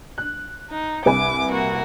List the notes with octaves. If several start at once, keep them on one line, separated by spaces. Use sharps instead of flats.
F#6
D#4
C2 B4 G#5 D6
A#3 F#4